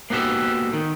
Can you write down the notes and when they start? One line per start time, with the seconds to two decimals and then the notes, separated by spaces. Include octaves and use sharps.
0.10 A#3 B3 F#4 G4 A4
0.73 D#3